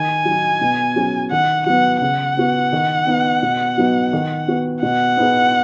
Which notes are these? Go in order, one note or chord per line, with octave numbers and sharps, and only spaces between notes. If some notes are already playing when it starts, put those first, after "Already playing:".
Already playing: D#3 G#5
F#3 D#4
B2
F#3 C#4 G#4
D#3 F#5
F#3 B3 F#5
C#3 F#5
B3 F#4
D#3
B3 D#4
B2
F#3 B3 D#4 F#4
D#3
B3 F#4
B2 F#5
B3 D#4 G#4